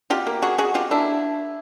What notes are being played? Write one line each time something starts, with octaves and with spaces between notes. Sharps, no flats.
B2 F4 G4
A#3
F#3 F#4 G#4
B2 F#4 G#4
B2 F4 G4
A#3 D4 E4